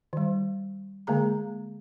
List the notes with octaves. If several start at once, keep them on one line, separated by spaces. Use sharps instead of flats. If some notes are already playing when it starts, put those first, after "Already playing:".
D#3 G3
D3 G#3 A#3 G#4 A#5